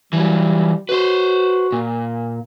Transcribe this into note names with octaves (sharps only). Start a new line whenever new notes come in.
E3 F#3 G3
F#4 B4 C5
A#2